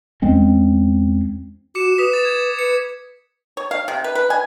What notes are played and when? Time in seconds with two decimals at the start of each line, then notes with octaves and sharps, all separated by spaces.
0.22 E2 G#3 C4 C#4
1.75 F#4 D6 C#7 E7
1.98 B4 D#6 B6
2.13 A6
2.25 G#6
2.59 B4 C#7
3.57 C#5
3.71 F5
3.88 C3
4.04 B4
4.15 B4
4.30 G#5